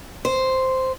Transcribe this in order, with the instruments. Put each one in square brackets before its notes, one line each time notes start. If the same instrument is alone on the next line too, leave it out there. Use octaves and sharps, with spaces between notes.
[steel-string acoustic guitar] C5